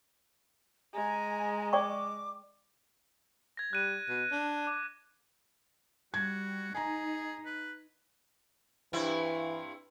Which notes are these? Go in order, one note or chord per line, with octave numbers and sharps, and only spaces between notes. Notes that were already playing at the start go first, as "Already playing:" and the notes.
G#3 G#5 A#5
D5 G5 C#6 D6
G#6 A#6
G3 F#6 D#7
B2
D4
D6
G3 F#4 G#6
D#4 G#4 G#5 A#5
B4
G2 E3 C4 E4